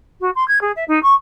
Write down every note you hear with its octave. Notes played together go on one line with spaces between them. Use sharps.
F#4
C6
G#6
G#4
E5
D#4
C#6